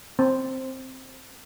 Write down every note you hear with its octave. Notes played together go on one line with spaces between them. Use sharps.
C4